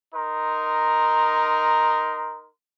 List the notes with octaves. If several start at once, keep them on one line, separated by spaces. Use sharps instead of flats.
D#4 A#4 C6